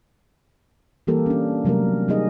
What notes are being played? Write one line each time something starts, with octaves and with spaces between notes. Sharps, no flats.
E3 G3 A#3 G4 A4 A#4
C#4 D4
C3 F#3 G3 A3 A#4
G3 D#4 G#4 D#5